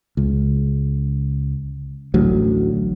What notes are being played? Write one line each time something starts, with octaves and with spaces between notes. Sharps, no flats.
C#2
A1 D2 F#3